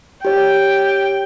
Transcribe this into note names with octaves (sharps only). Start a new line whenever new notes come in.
G4 C#5 G5